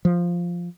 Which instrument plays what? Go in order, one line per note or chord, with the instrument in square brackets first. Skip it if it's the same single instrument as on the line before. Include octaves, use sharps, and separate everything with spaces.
[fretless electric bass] F3